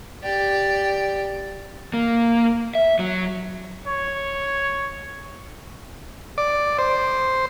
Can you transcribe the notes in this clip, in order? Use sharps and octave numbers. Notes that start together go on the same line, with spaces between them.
G4 D5
A#3
E5
F#3
C#5
D5
C5